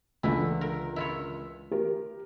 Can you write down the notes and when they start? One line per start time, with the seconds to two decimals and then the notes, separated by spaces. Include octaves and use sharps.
0.23 C#2 D3 E3 E4
0.61 A#4
0.96 E4 F4 C#5
1.71 G4 A#4